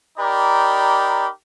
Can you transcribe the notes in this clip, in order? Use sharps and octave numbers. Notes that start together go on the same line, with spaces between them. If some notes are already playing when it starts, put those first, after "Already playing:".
D#4 G4 A#4 D5 B5